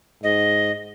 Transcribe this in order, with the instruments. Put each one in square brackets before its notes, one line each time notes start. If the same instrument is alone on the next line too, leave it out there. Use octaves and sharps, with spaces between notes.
[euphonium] G#2 [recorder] D#5